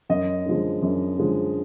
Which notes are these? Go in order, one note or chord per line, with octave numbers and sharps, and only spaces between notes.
F#2 D#5
D3 F3 G#3
F#2
D3 F3 G#3